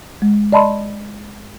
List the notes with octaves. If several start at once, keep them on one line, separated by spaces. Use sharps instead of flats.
G#3
D5 D#5 A5 B5 C6